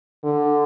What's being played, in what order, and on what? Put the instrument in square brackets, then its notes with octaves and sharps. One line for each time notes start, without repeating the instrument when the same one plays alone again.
[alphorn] D3